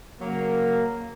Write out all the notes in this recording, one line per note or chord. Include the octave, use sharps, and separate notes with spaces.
C#3 F#3 A#3